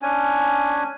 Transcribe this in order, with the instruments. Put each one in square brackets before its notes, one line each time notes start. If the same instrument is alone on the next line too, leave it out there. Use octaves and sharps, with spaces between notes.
[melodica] C#4 D4 G#5